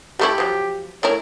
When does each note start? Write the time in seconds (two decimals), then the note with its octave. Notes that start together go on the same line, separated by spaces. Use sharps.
0.19 G3 A3 E4 G4
0.38 F3 F#3
1.03 A3 E4 A#4 C#5